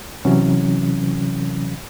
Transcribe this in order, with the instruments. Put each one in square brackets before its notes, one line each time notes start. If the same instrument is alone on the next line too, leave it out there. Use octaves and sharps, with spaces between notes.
[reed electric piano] C3 E3 F#3 C#4